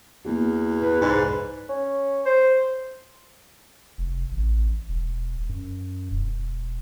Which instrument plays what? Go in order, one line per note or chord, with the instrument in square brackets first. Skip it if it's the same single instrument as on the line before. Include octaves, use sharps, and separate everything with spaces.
[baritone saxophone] E2 [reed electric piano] A#3 B3 F#4
[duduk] B4
[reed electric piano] C2 F2 D5 [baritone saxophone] G#2
[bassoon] C#4
C5
[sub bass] F1
A1
E1
F#2
E1